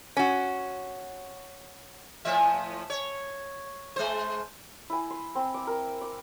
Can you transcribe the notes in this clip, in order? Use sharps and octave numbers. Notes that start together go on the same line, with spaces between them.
C#4 F#4
A2 F3 E5
C#5
G#3 C5
E4 G#5
C6
C4
D6
A#4
D6